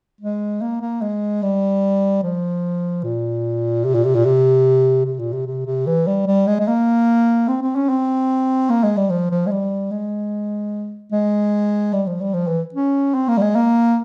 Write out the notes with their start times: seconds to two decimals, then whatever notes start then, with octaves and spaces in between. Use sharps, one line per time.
0.21 G#3
0.61 A#3
0.81 A#3
1.01 G#3
1.42 G3
2.23 F3
3.03 A#2
3.84 C3
3.94 A#2
4.05 C3
4.15 A#2
4.25 C3
5.06 C3
5.19 A#2
5.33 C3
5.47 C3
5.66 C3
5.86 E3
6.07 G3
6.27 G3
6.47 G#3
6.60 G#3
6.68 A#3
7.48 C4
7.62 C4
7.75 C#4
7.89 C4
8.70 A#3
8.83 G#3
8.97 G3
9.10 F3
9.30 F3
9.46 G#3
9.51 G3
9.91 G#3
11.12 G#3
11.93 G3
12.07 F3
12.20 G3
12.33 F3
12.47 E3
12.74 C#4
13.14 C4
13.28 A#3
13.37 G3
13.42 G#3
13.55 A#3